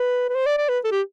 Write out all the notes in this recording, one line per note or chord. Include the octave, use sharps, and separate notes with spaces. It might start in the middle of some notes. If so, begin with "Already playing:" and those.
Already playing: B4
B4
C5
D5
D5
B4
A4
G4